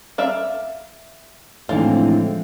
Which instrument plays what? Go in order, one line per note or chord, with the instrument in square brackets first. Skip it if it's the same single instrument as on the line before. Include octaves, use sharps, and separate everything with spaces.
[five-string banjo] D5 E5 F5
[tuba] A2 [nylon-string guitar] D3 E3 D#4 [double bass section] F3 G#3 C4 [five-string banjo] F4